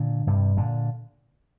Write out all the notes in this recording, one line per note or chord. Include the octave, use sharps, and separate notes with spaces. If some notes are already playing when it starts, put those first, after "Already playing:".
Already playing: A#2 D3
G2 C3
A#2 D3